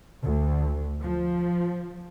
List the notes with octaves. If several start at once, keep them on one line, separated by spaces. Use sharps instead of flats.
D2
F3